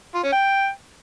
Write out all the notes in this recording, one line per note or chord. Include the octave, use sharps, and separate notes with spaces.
F4
C#4
G5